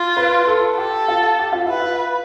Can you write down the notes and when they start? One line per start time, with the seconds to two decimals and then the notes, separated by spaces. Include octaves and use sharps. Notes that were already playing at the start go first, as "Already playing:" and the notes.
Already playing: F4
0.17 B4
0.47 A4
0.77 G4 A4
1.08 F4
1.39 G4
1.52 F4
1.65 E4 B4
1.80 F4